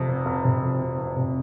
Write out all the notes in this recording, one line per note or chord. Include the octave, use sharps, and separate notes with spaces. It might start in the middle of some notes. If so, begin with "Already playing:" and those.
Already playing: F2 C3
F1
F1
C3
F2
F1
F1
C3